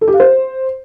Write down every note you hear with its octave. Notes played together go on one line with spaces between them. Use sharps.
A4
G4
F5
C5